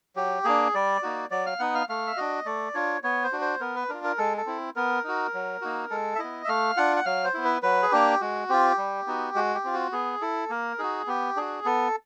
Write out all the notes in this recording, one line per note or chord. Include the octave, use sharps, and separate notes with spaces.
F#3 G4
A#3 D4 G#4
G3 D5
A#3 D#4 F#4
F#3 D5
F5
B3 D#4 F#5
F5
A3 F5
E5
D4 F#4 D#5
A3 D5
D4 F4 C#5
B3 C#5
C5
D4 F#4
C5
B3 A#4
B4
D4 F4 A#4
A#4
G#3 A4
A4
C4 E4
B3 A#4
D#4 F#4
F#3
A#3 D#4 F#4
G#3 A4
E5
B3 E4 D#5
E5
A3 F5
D4 F4 F#5
F#5
F#3 F5
C5
B3 E4
B4
F#3 B4
G#4
A#3 D4 G4
G#3 F#4
C4 F4 G4
G3
B3 D#4 F#4
G#3 F#4
G4
C4 F4
F#4
B3 G#4
E4 A4
A#3 A#4
D#4 F#4 G#4
B3 G4
D4 F#4 G#4
B3 A4